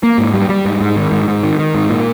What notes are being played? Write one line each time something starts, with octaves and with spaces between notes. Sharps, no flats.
A#3
G#2
G3
G3
G#2
G#2
D#3
G#2
G#2
D#3
D#3
G#2
A#2